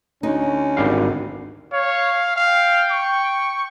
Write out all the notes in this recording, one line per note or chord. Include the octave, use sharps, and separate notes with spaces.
D2 C#4 D#4
G#1 G3 F5
C#5 F5
F5 G5
C#6